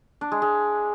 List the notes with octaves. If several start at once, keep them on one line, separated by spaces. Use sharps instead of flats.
D4
G#3
G#3